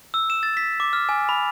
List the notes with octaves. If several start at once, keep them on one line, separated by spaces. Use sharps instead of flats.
E6
E7
A6
B6
D6
F6
G#5
B5